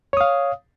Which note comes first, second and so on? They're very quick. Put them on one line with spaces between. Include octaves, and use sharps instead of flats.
C#5 D#6 F5